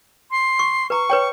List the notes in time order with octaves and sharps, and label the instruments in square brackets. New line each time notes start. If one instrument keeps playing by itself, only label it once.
[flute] C6
[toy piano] C#6
[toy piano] B4 A#5 [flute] C#6
[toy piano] B4 C#5 G5